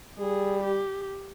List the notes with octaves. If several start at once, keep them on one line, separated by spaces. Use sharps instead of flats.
G3 G#4
G4